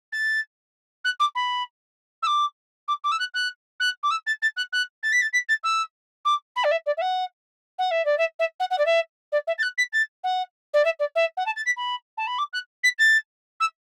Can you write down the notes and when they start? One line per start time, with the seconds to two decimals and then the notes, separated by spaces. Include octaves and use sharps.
0.12 A6
1.04 F#6
1.19 D6
1.35 B5
2.22 E6
2.26 D6
2.88 D6
3.04 D6
3.11 E6
3.19 F#6
3.34 F#6
3.80 F#6
4.03 D6
4.10 E6
4.26 A6
4.42 A6
4.56 F#6
4.72 F#6
5.03 A6
5.12 B6
5.21 A6
5.33 B6
5.48 A6
5.63 E6
6.25 D6
6.56 B5
6.64 D5
6.71 E5
6.86 D5
6.97 E5
7.01 F#5
7.78 F#5
7.91 E5
8.05 D5
8.18 E5
8.39 E5
8.59 F#5
8.70 F#5
8.78 D5
8.85 E5
9.32 D5
9.47 E5
9.58 A6
9.62 F#6
9.77 B6
9.92 A6
10.23 F#5
10.73 D5
10.84 E5
10.99 D5
11.15 E5
11.37 F#5
11.46 A5
11.56 A6
11.65 B6
11.76 B5
12.17 A5
12.27 B5
12.38 D6
12.53 F#6
12.83 B6
12.98 A6
13.60 E6